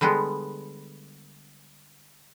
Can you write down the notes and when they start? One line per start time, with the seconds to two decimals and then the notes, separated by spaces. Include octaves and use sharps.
0.01 D3 G3 G#3 B3